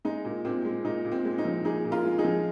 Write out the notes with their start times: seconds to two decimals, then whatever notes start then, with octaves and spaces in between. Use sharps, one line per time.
0.05 G#3 D#4
0.25 A#2
0.45 A#2 C4
0.65 G#3
0.85 A#2 D#4
1.05 A#2
1.12 C4
1.25 G#3
1.38 D#4
1.45 F3
1.65 A#2 D#4 G#4
1.85 A#2
1.91 F4 A#4
2.05 G#3
2.18 D#4 G#4
2.24 F3